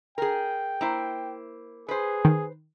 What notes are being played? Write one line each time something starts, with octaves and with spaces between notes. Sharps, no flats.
G#4 A#4 G5
A#3 E4 C5
G#4 B4 C5
D#3